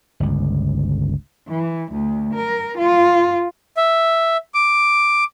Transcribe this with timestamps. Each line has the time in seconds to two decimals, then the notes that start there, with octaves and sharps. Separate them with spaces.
0.20 G1 C#2
1.48 E3
1.92 D2
2.34 A#4
2.78 F4
3.77 E5
4.54 D6